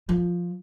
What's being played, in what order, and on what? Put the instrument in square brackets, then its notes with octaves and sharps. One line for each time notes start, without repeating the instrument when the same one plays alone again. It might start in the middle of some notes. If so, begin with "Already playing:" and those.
[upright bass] F3